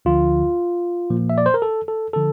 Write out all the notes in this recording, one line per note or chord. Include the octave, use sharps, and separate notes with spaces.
D2 D3 F3 F4
A#2 F3 A#3
E5
D5
C5
A#4
A4
A4
D3 F3 A4